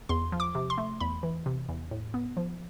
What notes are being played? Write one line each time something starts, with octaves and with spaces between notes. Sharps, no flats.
E2 C6
F3
D6
C3
C6
A3
E2 B5
E3
C3
E2
A2
B3
F3